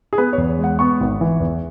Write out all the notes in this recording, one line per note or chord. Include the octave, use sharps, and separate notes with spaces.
G#4
B3 B4
C#5
E2
G#3
F#5
B3 C#6
G#1
E3
E2